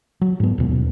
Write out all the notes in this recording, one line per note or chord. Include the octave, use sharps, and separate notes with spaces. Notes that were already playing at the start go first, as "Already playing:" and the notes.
F#3
G#2 B3
D#2 B2